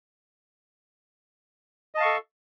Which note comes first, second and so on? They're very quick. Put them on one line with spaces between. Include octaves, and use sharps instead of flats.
D#5 A5 F5 C#6 A4